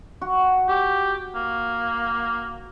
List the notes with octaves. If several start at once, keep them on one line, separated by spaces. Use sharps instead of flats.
F#4
G4
A#3